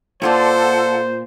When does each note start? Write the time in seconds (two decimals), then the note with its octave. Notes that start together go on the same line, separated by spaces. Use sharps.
0.22 A#2 E4 F4 A4 C5 D5 F#5